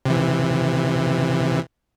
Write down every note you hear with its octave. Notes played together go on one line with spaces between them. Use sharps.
C3 E3